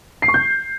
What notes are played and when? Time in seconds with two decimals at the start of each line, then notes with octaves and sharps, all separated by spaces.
0.22 C7
0.28 C#6
0.34 G6